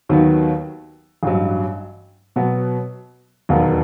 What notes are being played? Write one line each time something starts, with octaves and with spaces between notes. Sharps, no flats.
D#2 D#3 F#3 B3
A1 G2 F#3
B2 F#3 B3 F#4
E1 D#2 D#3 F#3 B3